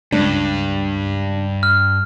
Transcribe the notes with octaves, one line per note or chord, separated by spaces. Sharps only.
C#2 G2 D4
F6